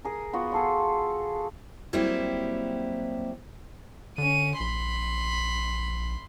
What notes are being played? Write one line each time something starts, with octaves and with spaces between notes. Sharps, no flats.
G#4 A#4
B3 F4 F#4
G#4 A4 C6
F#3 G3 A#3 C4 E4 G4
D3 C#4 D#7
A#1 B5 C6